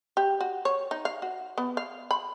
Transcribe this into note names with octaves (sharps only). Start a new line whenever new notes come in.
G4
F#4
C#5
D#4
F5
F#4
B3
F5
B5